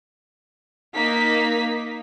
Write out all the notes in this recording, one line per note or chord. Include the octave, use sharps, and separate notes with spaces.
A#3 D#4 B6